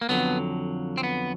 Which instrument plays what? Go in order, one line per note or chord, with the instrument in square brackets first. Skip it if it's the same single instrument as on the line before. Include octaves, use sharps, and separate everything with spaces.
[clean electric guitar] A#3
F2 D3 F#3 B3
C4
B3